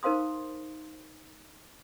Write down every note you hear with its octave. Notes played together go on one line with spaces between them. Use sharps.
D#4 A#4 C5 F5 C6 D#6